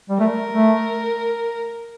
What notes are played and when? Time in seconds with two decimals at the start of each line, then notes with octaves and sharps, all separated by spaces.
0.10 G3
0.20 A3 A#4
0.54 A3